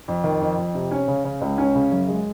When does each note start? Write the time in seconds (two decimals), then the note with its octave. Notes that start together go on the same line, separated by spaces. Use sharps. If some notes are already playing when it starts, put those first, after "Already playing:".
0.08 F2
0.24 D#3
0.41 F2
0.58 F2
0.74 C3
0.91 C#4
1.08 C#3
1.24 C#3
1.41 C#2
1.58 C#4
1.75 C#3
1.92 F#2
2.08 G#3